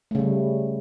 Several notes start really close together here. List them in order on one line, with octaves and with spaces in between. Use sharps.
A3 C#3 G3